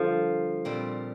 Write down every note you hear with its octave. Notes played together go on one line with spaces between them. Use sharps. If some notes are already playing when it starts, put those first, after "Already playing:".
Already playing: D3 F3 G3 A#3
A#2 G3 C4